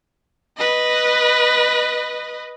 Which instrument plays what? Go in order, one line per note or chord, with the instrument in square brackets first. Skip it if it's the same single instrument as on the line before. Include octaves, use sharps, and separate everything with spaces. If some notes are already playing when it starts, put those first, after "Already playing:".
[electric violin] B4 D#5